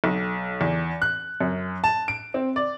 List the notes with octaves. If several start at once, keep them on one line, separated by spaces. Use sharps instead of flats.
B1
E2
F#6
F#2
A5
D7
C4
D5